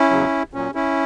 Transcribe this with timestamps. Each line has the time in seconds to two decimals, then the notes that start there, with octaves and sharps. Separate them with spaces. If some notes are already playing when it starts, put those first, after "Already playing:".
Already playing: C#4 E4
0.11 E2 C#3 F#3
0.53 A#2 F#3 C#4
0.75 C#4 E4